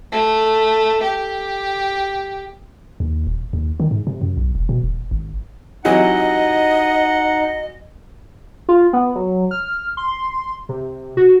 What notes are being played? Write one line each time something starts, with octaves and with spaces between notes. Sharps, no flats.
A3
G4
D#2
D#1
D#2
D#3
G#2
C3
F#2
B1
E1
B2
D#1
G#1
C3 E3 F#3 D#4 D#5 F#5
F4
B3
F#3
F6
C6
C3
F#4